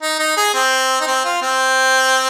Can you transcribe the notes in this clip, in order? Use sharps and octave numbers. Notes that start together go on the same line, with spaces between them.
D#4
D#4
G#4
C4
D#4
C4
F4
C4